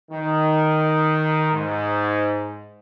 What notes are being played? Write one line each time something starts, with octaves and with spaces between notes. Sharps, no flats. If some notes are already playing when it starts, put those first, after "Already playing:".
D#3
G#2